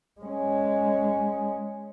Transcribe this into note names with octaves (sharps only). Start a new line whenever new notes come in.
G#3 C#4